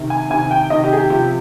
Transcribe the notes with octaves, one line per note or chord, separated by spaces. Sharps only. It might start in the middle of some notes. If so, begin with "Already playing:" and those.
Already playing: C3 D#3
G#5
C3 D#3 G#5
G5
C3 D#3 D#5
G4
G#4
G4
C3 F3 G4